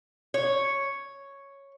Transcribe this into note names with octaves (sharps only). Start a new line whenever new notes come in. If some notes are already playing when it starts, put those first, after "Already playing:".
C#5